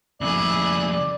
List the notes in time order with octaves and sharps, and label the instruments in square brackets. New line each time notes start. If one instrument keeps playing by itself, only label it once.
[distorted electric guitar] F2 C#3 [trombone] E4 [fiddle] G#4 F#6 [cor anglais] D5